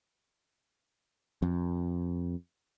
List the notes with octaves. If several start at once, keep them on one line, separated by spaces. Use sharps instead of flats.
F2